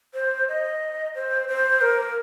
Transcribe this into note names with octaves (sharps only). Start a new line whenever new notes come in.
C5
D#5
C5
C5
A#4